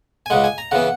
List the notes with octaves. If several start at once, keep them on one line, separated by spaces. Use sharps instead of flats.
G#5
C#2 C#3 G#3 F#5
G#5
A#5
C#3 E3 B3 F#5